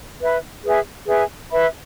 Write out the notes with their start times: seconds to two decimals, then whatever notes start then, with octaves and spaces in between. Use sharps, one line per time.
0.21 B4 E5 B5
0.64 G#4 B4 E5 G#5
1.07 G#4 B4 E5 G#5
1.51 B4 E5 B5